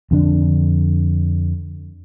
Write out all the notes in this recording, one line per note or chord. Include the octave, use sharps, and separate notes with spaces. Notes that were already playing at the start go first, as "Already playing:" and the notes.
F2 D3 D4